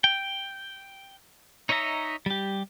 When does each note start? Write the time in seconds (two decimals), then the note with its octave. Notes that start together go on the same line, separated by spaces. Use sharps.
0.04 G5
1.69 D#4 C#5 D#5 E5 A#5
2.26 G3 G4